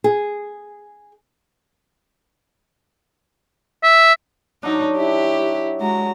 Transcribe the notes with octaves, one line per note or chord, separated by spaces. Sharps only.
G#4
E5
F#3 D4 D#4
E4 G4
G#3 F#4 A#5